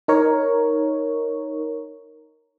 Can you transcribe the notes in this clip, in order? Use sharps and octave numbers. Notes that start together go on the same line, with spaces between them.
D#4 A#4 C#5